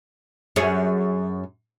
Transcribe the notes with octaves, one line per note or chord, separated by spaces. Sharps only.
F#2 G#4 C#5